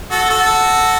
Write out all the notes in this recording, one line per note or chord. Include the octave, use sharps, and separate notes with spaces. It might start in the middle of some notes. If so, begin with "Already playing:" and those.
F#4 A4
F#4 A4